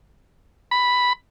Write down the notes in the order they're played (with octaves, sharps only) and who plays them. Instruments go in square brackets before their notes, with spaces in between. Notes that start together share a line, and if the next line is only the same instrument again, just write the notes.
[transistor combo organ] B5